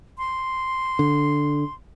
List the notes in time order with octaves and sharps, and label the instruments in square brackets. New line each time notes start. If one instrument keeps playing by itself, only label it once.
[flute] C6
[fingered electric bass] D3